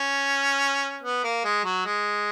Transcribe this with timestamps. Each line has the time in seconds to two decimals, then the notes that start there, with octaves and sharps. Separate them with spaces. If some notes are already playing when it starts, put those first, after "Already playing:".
Already playing: C#4
1.03 B3
1.24 A#3
1.44 G#3
1.65 F#3
1.85 G#3